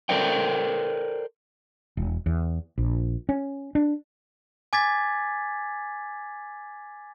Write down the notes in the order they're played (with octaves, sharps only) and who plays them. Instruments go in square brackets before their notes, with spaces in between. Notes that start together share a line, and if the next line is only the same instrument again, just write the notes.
[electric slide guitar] A4 A#4 C5 D5 G5
[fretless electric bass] E1
E2
A#1
C#4
D4
[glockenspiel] G#5 D6 G#6 A6 B6